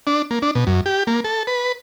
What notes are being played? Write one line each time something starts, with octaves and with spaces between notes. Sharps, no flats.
D4
A#3
D4
B2
F#2
G4
A#3
A4
B4